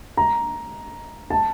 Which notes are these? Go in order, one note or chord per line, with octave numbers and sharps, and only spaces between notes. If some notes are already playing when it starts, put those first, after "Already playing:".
A#5
A5